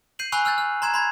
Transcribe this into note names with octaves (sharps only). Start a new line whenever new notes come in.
G6 C7 D#7 F#7
G#5 B5 C#6 E6 F#6 F7
E6 F6 G6 A6
F6
A#5 C6 G#6 E7
B5 C6 G#6